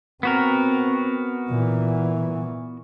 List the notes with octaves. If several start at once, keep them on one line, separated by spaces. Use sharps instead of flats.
B3 C4 F#4 A#4
A#2 E3